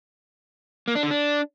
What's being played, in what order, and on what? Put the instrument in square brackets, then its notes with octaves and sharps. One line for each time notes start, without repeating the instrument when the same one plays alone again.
[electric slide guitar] A#3
D4
D3
D4